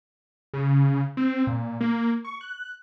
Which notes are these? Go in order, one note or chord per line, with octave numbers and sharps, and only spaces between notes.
C#3
C4
A#2
A#3
C#6
F#6